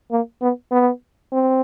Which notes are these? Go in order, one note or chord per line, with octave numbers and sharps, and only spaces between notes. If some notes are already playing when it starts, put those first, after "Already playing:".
A#3
B3
B3
C4